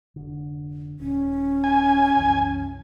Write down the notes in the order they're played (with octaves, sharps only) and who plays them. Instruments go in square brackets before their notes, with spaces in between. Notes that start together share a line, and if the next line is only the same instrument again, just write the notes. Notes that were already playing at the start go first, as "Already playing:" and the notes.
[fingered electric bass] F1 D3
[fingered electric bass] D#1 [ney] C#4
[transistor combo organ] G#5
[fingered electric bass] F#1 C2 E3